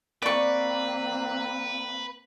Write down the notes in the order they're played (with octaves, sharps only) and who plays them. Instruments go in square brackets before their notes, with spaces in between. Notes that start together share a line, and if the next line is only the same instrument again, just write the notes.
[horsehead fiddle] A#3 C4 [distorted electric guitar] B4 [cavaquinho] D5 C#6